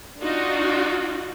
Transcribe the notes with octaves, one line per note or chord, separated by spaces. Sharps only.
D4 D#4 F4 F#4